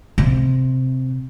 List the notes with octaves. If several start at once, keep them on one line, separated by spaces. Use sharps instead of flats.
C3